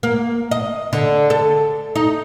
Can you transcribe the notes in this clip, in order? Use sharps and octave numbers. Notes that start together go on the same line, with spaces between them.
A#3
D#5
D3
A4
D#4